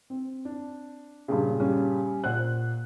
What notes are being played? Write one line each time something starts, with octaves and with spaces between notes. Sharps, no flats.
C4
D4
G2 A#2 C#3
G3 C#4
A#2 C5 F#5 F#6